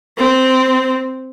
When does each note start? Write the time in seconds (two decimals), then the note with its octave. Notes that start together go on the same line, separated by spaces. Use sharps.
0.18 C4